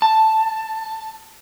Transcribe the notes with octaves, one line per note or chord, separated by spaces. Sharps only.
A5